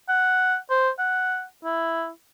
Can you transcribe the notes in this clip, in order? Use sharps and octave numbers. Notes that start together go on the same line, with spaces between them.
F#5
C5
F#5
E4